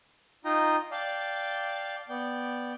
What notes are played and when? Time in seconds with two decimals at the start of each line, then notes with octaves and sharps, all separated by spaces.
0.45 D#4 F4 D#5 G5 A#5
0.91 D5 F5 G5 A5
2.09 B3 D5 G5